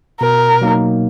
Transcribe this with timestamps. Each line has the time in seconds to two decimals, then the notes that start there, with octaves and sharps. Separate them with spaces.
0.20 B2 A#4
0.62 F#3 A#3 D#4